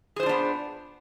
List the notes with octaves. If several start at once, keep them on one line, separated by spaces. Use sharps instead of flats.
B3 D4 F4 G#4 C5